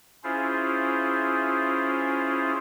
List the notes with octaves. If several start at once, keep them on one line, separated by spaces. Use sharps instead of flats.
C#4 E4 F4 G#4 C5